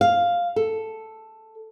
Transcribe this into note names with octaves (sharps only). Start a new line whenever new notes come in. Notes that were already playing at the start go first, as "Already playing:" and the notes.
F5
A4